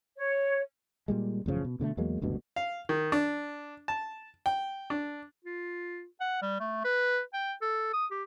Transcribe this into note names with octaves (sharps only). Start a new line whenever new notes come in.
C#5
A#2 G3 G#3
A1 F#2 C#3 F3
B2
B2 D3 F#3 A3
E2 F#3 G#3 A#3
F#1 D2 G2 B2
F5
D#3
D4
A5
G5
D4
F4
F#5
G3
A3
B4
G5
A4
D#6
G4